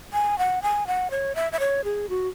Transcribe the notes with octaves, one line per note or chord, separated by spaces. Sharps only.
G#5
F#5
G#5
F#5
C#5
E5
E5
C#5
G#4
F#4